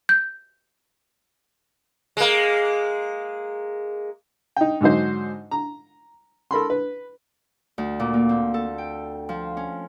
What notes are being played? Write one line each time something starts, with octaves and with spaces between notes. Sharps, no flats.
G6
G#3 A#3
D#4 G5
G#2 D3 F#3 D#4 C5
A#5
A4 A#4 B5 C6
B4
D2
A#2
A#3
C4
A4
G5
F3
C#4